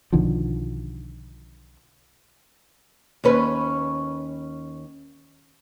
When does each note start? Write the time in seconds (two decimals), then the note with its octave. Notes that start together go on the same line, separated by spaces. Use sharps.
0.13 B1 D3 D#3 F3
3.24 D#2 C#4 B4